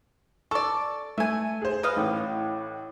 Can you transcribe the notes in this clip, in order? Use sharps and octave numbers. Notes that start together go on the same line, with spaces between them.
A4 D5 C#6
A3 E5 G#5
G#4 C5
B4 D#5 F5
A1 A2